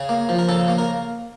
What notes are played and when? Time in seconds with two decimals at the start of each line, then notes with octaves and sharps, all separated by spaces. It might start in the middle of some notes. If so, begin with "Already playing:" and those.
Already playing: C#3 G#4
0.09 A#3
0.29 F3
0.39 A#4
0.49 C#3 A4
0.68 A#3
0.78 A#4